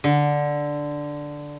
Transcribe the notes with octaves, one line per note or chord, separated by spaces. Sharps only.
D3